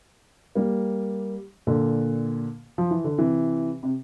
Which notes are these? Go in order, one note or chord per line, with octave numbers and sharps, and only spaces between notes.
G3 A#3
A#2 D3
F3
E3
D3
C3 E3
C3